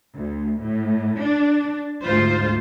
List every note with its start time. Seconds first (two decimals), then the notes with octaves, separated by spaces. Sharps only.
0.16 D2
0.62 A2
1.18 D4
2.04 D2 G#2 F4 C5